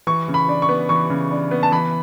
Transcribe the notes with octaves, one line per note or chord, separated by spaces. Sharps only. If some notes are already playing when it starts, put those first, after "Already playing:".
E3 C#6
C#3
B5
D4
C#6
B3
E3 C#6
C#3
D4
B3
A5
E3 B5